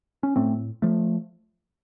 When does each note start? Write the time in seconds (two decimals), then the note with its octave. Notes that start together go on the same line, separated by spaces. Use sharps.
0.23 C#4
0.36 A2 A3 C4
0.82 F3 A3